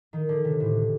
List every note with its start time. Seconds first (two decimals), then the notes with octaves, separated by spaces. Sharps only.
0.13 D#3
0.29 D3
0.44 C3
0.60 A2